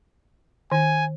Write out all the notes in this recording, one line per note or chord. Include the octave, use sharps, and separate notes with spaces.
D#3 G#5